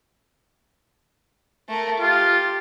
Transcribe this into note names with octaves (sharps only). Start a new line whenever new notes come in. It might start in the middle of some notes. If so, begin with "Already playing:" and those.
A3 A#4
F4 G4